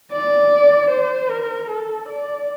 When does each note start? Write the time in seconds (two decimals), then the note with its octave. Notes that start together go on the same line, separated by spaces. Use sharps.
0.13 D5
0.91 C5
1.31 A#4
1.69 A4
2.09 D5